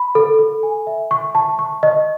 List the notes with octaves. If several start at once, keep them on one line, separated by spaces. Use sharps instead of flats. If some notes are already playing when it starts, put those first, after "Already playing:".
Already playing: B5
A4
A4
G#5
E5
C#6
A5
C#6
D#5